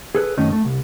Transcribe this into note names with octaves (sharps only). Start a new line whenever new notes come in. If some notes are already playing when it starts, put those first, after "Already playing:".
G#4 A4 B4
F#2 D#3 A3 C#4 D#4
A3
C2